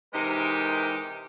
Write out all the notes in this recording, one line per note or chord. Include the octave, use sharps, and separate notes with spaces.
C3 E3 G#3 D#4 G4 A#4